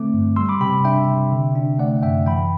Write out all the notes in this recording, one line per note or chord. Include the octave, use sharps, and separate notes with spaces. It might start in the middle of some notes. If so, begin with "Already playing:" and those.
Already playing: D3 A3 C4 D6
G2
G3 C6 E6
B5 D6
C3 G5 B5
D4 E5 G5
C3
D3
D4
A3 D5 F#5
F#2 E5 G5
E3 G5 B5